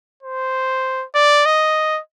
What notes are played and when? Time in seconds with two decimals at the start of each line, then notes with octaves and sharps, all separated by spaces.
0.23 C5
1.15 D5
1.45 D#5